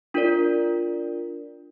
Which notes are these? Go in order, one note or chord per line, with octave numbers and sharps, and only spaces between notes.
D4 F4 A#4 D5